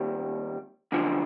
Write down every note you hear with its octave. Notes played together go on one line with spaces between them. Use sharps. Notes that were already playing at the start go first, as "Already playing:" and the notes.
Already playing: D#2 D#3 G3 C4
F#2 D3 F3